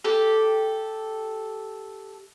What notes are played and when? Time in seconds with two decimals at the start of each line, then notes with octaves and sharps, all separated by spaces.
0.04 G4 A4